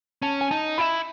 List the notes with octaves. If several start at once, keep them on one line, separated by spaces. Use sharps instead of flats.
C#4 A5
G#5
D#4 A5
E4 B5